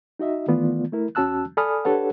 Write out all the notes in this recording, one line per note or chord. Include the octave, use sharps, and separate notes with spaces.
D#4 F#4 D#5 E5
D#3 E3 A3 B3 F4 D5
A3 E4 A#4
E2 C#4 F#4 A5 E6 F#6
A4 D5 G#5 B5 D#6 F6
D4 G4 A4 B4 C#5 F#5